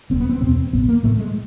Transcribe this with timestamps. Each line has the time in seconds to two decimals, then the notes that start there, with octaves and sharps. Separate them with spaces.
0.10 E1 C4
0.20 B3
0.29 C4
0.41 E2 B2 C4
0.73 A1 B3
0.89 A#3
1.04 A2 A3
1.19 G#3